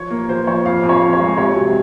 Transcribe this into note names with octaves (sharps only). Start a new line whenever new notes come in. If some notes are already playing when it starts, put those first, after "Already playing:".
Already playing: F3 C#5
A#3
F3 C5
F3 C#5
F2 F5
F2
C#5
F2
C#5
G#3
C3 C#5
F#3